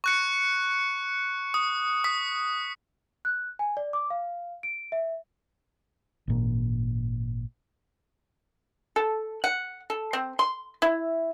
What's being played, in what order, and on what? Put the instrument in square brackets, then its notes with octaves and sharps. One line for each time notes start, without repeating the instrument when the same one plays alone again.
[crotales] C#6 F#6 C#7
D#6
D#6 B6
[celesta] F#6
G#5
D5
D6
F5
D7
E5
[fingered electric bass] G#1 A#2
[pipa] A4
F#5
A4
C4
C6
E4